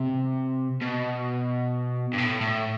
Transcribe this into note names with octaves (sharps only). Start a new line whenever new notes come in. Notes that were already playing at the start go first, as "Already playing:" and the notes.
Already playing: C3
B2
G2
A2
A2